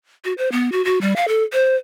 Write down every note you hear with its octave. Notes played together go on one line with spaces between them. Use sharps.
F#4
C5
B3
F#4
F#4
G3
F5
A4
C5